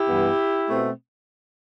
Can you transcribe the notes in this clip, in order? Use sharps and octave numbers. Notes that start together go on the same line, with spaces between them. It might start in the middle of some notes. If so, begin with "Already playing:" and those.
Already playing: E4 G4
G2 E3 B3
B2 A3 C4